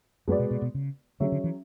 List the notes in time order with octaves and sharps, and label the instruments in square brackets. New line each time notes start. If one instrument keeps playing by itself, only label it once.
[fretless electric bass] F#2 [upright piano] G#3 B3 F#4 B4 D5
[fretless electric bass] B2
B2
B2
C#3
[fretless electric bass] D3 [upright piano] F#3 C#4 G#4 C#5 E5
[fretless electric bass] D3
E3